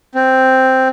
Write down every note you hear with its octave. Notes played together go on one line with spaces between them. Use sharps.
C4